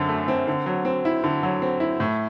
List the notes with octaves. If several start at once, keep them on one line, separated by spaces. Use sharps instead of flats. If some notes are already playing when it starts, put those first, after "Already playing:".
Already playing: F#2 D3 C4
A3
C4
D3
F#3
C4
E4
D3
F#3
C4
E4
A2